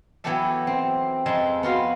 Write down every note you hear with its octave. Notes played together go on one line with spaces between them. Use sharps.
E3 F#3 B3 G4 A4 E5
C4
F2 G#3 A4 A5
B3 F4 F#4 F5